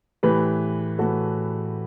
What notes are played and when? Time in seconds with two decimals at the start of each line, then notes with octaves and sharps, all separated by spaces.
0.23 A2 E3 G4 B4
0.99 A2 E3 F#4 A4